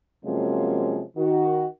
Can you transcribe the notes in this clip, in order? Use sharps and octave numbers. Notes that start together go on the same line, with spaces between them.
C3 F3 F#3 G#3 A#3 C#4
D#3 F#4